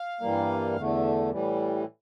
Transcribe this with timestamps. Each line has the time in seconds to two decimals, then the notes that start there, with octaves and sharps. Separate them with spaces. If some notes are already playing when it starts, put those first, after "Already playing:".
Already playing: F5
0.21 G2 E3 G3 A#3
0.76 E2 D3 A3
1.30 A2 E3 G3